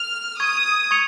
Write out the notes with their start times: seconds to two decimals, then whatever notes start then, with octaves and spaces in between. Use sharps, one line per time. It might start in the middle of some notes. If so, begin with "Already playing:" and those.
Already playing: F6
0.39 C#6 D#6 G#6 D#7
0.91 C#6 G#6 C#7 F7